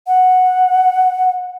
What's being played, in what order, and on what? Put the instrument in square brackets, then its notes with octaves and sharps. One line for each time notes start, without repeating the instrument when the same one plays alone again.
[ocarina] F#5